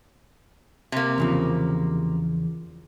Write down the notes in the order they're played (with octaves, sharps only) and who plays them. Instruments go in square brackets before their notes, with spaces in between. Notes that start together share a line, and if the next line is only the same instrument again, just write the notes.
[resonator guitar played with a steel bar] C3 A#3
[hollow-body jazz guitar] E2 C#3 F3